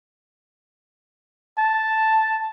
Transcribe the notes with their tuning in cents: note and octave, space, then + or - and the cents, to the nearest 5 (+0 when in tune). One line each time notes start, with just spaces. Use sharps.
A5 +0